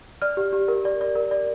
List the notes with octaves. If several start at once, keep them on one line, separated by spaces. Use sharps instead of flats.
D5 F6
G4
G4
A#4
D5
D5
A#4
D5